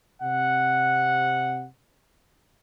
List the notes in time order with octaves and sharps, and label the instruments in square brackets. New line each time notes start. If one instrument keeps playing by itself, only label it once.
[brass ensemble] C3 F#5